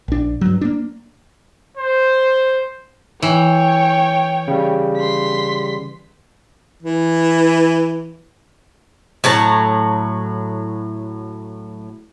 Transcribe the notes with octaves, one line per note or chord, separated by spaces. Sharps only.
A#1 D4
G2 F#3
A#3 D4
C5
E3 C#5 G5
C#3 G3
C6 B6
E3
A2 F#3 A5 A#5